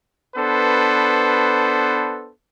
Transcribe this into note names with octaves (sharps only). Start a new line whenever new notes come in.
B3 D4 A4 B4 C5